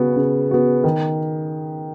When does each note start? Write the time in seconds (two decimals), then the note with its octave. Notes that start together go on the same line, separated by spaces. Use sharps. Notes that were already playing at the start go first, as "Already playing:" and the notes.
Already playing: C#3 B3 F#4
0.16 C#3
0.51 B3 F#4
0.84 D#3